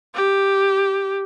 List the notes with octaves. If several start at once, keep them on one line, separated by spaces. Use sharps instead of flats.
G4